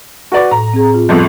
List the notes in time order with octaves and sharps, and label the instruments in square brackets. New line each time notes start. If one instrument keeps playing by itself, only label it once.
[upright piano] F#4 B4 D5
[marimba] A2 [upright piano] A#5
[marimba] C4 G#4
F4
[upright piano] G1 F2